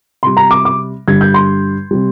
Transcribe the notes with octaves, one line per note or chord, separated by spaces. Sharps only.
C3 G3 C6
A#5
D6
D6
G2 D3 G3 G#6
G6
C6
C3 G3